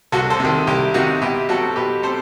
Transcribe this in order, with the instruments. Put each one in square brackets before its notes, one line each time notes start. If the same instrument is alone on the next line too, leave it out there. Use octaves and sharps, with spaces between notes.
[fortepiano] C2 F#4 A4
A4 C5
C3 D#3
C2 E4 G4
C3 D#3 D#4 F#4
B2 E4 G4
F#3 C4 F#4 A4
B2 G4 B4
C4 A4 C5